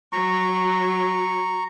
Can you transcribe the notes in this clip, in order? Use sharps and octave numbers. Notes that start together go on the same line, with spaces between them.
F#3 A#5 C#6